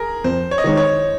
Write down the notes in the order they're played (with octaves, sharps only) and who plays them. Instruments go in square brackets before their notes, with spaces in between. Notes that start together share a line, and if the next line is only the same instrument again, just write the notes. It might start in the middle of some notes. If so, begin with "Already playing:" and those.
Already playing: [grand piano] G#4 A#4
[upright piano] F2 [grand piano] C5
[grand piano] C#5
D#5
[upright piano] D#3 G#3 D#4 [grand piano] C#5
[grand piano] C#5